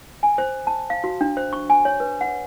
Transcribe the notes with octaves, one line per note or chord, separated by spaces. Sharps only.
G#5
C5
A5
F5
F#4
D4
C5
C#6
G#5
C#5
B4
F#5